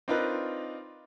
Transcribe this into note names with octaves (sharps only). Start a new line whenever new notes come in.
C4 D4 D#4 F4 A#4 B4